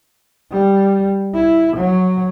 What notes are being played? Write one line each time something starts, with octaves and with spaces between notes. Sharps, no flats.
G3
E4
F#3